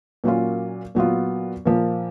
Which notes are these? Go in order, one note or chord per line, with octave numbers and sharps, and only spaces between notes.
A#2 F#3 A#3 C#4 F4
A#2 F#3 B3 F4
A#2 F3 A#3